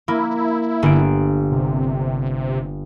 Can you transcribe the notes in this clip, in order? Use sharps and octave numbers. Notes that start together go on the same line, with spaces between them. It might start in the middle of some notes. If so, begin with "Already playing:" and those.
A#3 E4
G1 D7
C3